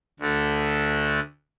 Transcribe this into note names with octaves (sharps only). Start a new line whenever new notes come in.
D2 D3 A3